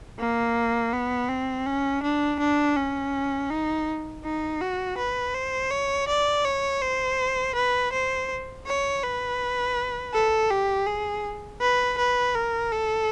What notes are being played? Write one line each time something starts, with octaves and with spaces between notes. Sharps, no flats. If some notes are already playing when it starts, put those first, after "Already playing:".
A#3
B3
C4
C#4
D4
D4
C#4
D#4
D#4
F#4
B4
C5
C#5
D5
C#5
C5
B4
C5
C#5
B4
A4
G4
G#4
B4
B4
A#4
A4